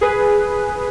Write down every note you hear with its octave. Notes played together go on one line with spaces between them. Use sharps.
G#4 B4